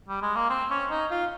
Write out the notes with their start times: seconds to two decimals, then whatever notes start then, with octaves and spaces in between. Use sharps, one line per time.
0.09 G3
0.22 G#3
0.36 A#3
0.50 C4
0.71 C#4
0.91 D#4
1.11 F4